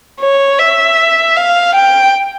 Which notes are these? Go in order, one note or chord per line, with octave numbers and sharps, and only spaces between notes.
C#5
E5
F5
G5